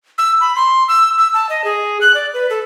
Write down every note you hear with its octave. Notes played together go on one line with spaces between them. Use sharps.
E6
B5
C6
E6
E6
A5
D#5
G#4
F#6
D5
B4
A4